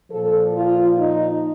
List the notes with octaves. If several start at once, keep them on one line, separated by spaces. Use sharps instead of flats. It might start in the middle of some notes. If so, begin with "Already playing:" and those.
A#2 F3 A4
F4
D#4